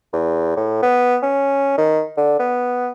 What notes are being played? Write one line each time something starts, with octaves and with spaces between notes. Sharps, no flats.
E2
A2
B3
C#4
D#3
D3
B3